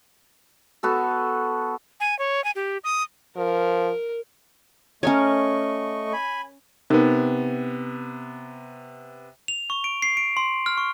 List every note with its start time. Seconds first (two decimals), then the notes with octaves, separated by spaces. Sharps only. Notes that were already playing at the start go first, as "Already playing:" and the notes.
0.83 B3 F#4 A4
2.00 G#5
2.19 C#5
2.44 G#5
2.56 G4
2.84 D#6
3.37 F3 A#4
5.03 A3 C#4 A#4 C#5 D#5 C#6
6.13 G#5 B5
6.90 C3 B3 D#4 A#4
9.48 F7
9.70 C#6
9.84 D7
10.02 C7
10.17 D7
10.37 C6
10.66 F6
10.78 C#6